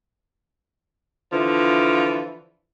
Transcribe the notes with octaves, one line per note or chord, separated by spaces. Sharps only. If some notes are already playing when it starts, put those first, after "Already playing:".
D3 E3 F3